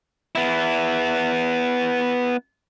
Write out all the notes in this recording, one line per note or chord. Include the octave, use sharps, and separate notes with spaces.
B3 E4